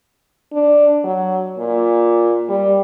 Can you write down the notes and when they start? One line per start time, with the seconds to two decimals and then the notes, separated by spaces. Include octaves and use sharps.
0.53 D4
1.04 F#3
1.58 A#2
2.49 G3